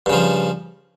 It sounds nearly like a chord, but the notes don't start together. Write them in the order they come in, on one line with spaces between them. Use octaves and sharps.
G2 C#3 F3